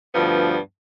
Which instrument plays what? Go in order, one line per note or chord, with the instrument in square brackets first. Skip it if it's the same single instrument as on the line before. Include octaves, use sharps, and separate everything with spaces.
[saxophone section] D2 G2 F3 B3